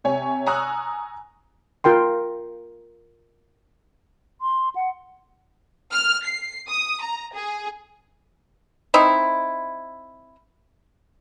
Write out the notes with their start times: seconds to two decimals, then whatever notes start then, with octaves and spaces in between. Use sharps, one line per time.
0.04 C3 C#5 G#5
0.46 G#5 A#5 C#6 D#6 E6 F#6
1.84 F4 A#4 G5 C6
4.41 C6
4.76 F#5
5.93 F6
6.26 C7
6.69 D#6
7.02 A#5
7.34 G#4
8.94 C4 D#4 E4